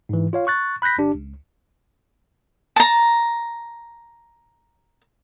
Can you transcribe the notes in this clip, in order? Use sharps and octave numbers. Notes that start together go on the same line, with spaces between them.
G#2 E3
F4 C#5 F5
C#6 F#6 A6
B5 F#6 G6 A#6 B6
G1 D4 G4
C#2
A5 A#5